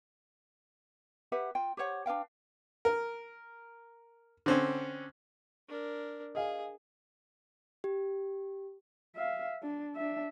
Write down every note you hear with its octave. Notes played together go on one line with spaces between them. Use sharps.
G4 B4 E5 F#5
F4 G5
G4 C5 C#5 F#5
D4 B4 F5 G5
A#4
D3 C4 C#4
D4 A#4
G#4 D#5 F5 G#5
G4
E5 F5
D4
D4 E5